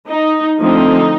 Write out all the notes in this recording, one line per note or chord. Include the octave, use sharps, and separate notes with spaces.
D#4
D3 F3 A3 C4 D#4